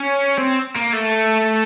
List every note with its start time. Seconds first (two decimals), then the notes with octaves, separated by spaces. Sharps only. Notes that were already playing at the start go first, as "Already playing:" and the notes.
Already playing: C#4
0.37 C4
0.75 A#3
0.93 A3